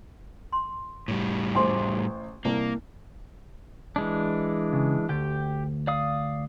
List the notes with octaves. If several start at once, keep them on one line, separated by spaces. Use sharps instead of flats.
C6
A2 G3
A1 C5 G#5 C6 D6
C2 A#3
E3 G#3 D4
C#3
D2 G4 G5
D5 F5 D#6